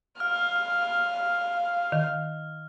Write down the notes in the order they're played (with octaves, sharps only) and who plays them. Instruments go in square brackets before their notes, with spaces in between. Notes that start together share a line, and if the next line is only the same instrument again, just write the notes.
[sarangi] F5 [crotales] F6
[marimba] D#3